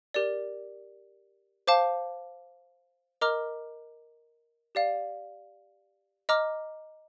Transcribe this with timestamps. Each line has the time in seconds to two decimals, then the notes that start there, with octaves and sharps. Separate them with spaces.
0.14 G4 A#4 D5
1.67 C5 F5 A5 D6
3.21 A#4 D#5 A#5 D6 F6
4.75 G4 D5 F5
6.29 D#5 A#5 D6 F6